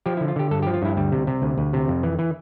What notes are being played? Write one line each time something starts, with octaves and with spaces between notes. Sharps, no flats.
F3 G4
E4
D3
F4
D3 G4
G2 A4
G4
F3
F4
G2 E4
D2 G3
C3
C3
D2
D2
C3
F2
E3
E3